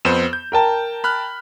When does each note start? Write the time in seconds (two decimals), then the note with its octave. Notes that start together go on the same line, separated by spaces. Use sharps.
0.05 F2 B3 C5 E7
0.33 G6
0.52 A#4 G5 A5
1.04 B5 F6 F#6